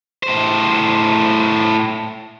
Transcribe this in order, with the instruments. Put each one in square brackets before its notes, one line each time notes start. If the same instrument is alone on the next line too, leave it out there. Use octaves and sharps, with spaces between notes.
[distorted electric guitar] A2 C5